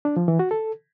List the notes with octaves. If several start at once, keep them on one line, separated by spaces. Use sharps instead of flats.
D4
F3
E3
F#4
A4